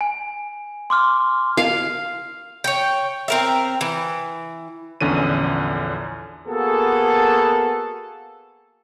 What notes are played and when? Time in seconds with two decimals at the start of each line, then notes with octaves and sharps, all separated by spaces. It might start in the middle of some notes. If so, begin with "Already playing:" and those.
0.01 G#5
0.90 C6 D6 F6
1.57 F5
2.64 C#5 G5
3.28 C4 A#4 E5
3.81 E3
5.01 A#1 E2 D3 C#4 D#7
6.47 A#3 B3 F#4 G#4 A4